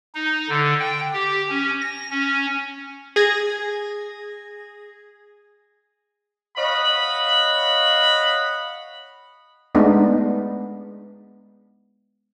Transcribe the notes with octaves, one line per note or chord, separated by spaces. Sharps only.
D#4
D3
G5
G4
C#4
A#6
C#4
G#4 G#6 A#6
C#5 D#5 F5 F#5 B5
G#3 A3 B3 D4 D#4